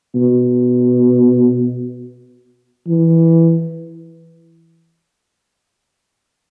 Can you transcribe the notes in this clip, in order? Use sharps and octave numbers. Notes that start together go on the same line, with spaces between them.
B2
E3